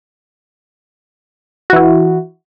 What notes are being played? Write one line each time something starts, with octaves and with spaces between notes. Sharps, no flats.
E3 E4 F#4